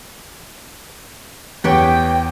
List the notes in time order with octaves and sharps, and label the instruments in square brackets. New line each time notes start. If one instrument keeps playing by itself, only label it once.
[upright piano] E2 [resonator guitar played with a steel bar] G4 B4 C#5 [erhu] G5